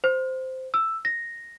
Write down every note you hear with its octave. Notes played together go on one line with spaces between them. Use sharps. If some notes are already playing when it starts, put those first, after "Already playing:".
C5
E6
A#6